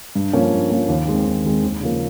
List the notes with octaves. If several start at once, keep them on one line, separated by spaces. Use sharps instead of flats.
G2
F3 A#3 C#4
G2
F3 A#3 C#4
D#2
D#3 G#3 C4
D#2
D#3 G#3 C4
D#2
C#3 F3 A#3